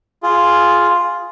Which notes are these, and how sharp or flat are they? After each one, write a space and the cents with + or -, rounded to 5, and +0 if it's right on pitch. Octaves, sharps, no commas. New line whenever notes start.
F4 +0 G#4 +0